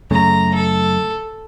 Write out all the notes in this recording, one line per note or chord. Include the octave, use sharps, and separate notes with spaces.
F#2 C#3 A3 A#5
A4